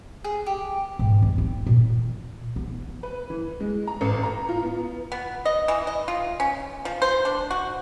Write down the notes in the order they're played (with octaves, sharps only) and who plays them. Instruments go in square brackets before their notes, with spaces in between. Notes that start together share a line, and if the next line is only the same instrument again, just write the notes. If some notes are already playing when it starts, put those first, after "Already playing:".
[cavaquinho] G#4
G4
[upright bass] G#2
E2
C4
A#2
B3
[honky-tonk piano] B4
E3
G#3
A#5
A1
A#5
F4
B3
[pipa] B3
D#5
E3
D#5
F4
C#4
F3
C5
D4
F#4